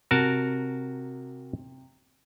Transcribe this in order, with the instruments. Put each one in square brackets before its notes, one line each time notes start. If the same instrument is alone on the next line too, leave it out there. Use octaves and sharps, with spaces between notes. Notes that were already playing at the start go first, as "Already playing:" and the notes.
[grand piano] C3 [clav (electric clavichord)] F#4 A#4 A5